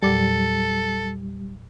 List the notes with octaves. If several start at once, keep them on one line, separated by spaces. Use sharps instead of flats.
E2 A#2 F#3 G3 A4